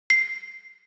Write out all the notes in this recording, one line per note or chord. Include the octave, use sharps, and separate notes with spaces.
C7